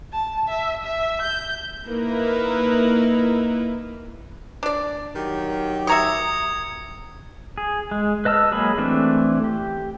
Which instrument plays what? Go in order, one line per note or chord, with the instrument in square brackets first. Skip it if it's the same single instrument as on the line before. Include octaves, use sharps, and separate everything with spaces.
[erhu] A5
E5
E5
G6
[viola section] A#3 D#4 E4 A#4 B4
[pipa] D4 D5
[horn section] D#3 F#3 G4
[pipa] E5 A#5 C#6 [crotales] D#6 G#6 C#7
[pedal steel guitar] G#4
G#3
B4 D#5 A5 E6 F6
F#3 G#3 A#3 G#4 B5
E3 A3 C4 D4
G4